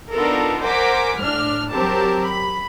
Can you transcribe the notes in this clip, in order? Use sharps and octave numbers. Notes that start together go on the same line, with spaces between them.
B3 D4 D#4 F4 A4 A#4
A#4 C5 F#5 G#5 D6 B6
A2 D4 F6
F#3 C4 G4 A#4 A5
B5